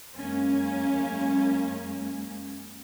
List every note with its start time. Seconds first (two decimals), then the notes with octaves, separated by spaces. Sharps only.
0.16 F#2 G#3 A#3 C#4